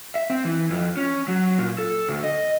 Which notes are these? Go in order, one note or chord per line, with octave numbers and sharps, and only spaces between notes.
E5
C4
E3
F2
C#4
F#3
A#2
A4
D2
D#5